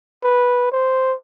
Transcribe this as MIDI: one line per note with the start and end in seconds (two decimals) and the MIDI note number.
0.23 0.70 71
0.72 1.14 72